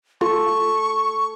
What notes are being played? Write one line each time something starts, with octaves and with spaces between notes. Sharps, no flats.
F4 A4 C#6